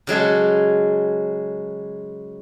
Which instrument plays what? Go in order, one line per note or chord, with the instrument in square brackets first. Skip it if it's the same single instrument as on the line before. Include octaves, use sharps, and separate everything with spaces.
[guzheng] C#3 F#3 G#3 A4